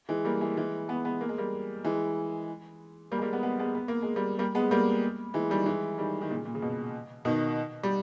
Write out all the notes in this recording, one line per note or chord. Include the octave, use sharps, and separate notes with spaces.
E3 G#3
G3 A#3
E3 G#3
E3 G#3
G#3 B3
G#3 B3
A#3
G#3
G3 A#3
E3 G#3
G3 A#3
G#3
G3 A#3
G#3 B3
G#3 B3
G#3 B3
B3
A#3
G#3
G3 A#3
G3 A#3
G#3 B3
G3 A#3
E3 G#3
D#3 G3
E3 G#3
D#3 G3
D#3
A#2 C#3
A#2
C#3
B2
B2 D#3
G3